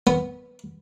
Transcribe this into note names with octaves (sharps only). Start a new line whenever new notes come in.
B3